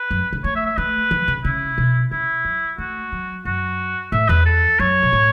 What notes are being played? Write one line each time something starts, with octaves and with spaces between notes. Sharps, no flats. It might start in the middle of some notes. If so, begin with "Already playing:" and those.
Already playing: B4
F#2
C#3
A3 C#5
E5
E5
A3 B4
E3
C#3
C#3 E4
B2
C#3 E4
F#3
A3 F#4
F#3
F#2 F#4
A2 E5
E2 B4
A4
F#2 C#5
B2
A2